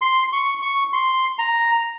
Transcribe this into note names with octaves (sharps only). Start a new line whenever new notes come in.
C6
C#6
C#6
C6
A#5